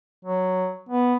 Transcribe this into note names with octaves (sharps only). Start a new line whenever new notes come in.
F#3
B3